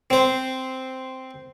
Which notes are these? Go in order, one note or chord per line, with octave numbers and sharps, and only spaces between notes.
C4 C5